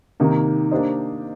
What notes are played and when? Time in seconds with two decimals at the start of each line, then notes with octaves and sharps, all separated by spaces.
0.20 C3 D#3 A#3 D#4
0.71 A#3 D4 G4 C5 D#5